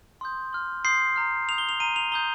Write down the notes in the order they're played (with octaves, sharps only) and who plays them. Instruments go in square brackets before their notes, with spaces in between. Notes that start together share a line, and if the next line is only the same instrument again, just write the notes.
[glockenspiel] C6 D#6 G6
C6 F6
C6 D#6 G6 C7
A#5 F6
A#5 D#6 G6 F7
G7
F7
A#5 F6 D#7
F7
A#5 D#6 G6 G7